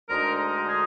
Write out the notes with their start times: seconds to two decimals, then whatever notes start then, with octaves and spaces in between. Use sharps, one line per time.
0.09 D2 D3 G#3 D#4 A#4
0.38 A#4
0.68 G#4